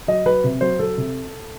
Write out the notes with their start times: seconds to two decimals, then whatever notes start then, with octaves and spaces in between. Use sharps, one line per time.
0.08 F#3 D#5
0.26 F#3 B4
0.44 C3
0.61 F#3 C5
0.79 F#3 A4
0.97 C3